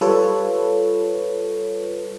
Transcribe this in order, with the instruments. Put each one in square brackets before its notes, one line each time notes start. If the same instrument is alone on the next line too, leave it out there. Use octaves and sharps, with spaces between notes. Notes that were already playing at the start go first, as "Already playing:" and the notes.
[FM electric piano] G3 F4 A4 B4 C#5